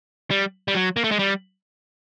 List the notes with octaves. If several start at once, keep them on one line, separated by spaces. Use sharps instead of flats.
G3
G3
F#3
A#3
A3
G#3
G3